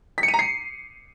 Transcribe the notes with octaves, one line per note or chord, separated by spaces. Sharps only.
B6
C#7
D#7
A#5
C7